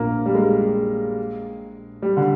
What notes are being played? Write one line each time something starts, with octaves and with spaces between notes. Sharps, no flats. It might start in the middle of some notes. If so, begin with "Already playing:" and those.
Already playing: A#1 A#2 A#3
G3
G#3
G3
D3